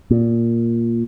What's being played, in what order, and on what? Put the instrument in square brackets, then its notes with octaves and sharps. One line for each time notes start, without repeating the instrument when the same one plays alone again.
[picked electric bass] A#2